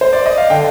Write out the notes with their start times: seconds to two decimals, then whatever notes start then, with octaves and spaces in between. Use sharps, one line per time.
0.01 C5
0.13 D5
0.26 D#5
0.38 F5
0.50 D3 G5